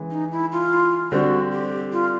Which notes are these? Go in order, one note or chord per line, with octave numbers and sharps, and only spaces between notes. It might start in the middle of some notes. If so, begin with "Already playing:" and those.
Already playing: C#3 E3 G#3
D#4
E4
F4
D3 G3 C4 F#4
G4
F4